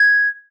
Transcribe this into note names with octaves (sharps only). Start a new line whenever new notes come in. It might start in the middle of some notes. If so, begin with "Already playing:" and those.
Already playing: G#6